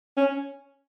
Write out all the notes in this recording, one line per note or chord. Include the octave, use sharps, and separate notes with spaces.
C#4